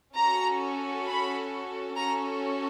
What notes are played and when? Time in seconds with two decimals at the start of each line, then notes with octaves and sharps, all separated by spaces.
0.15 C#4 F#4 A4 A#5
1.06 B5
1.96 C#4 F#4 A4 A#5